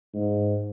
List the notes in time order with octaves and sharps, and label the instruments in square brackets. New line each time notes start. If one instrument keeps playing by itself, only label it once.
[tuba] G#2